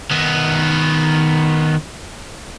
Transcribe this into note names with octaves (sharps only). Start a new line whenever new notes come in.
D#3 B3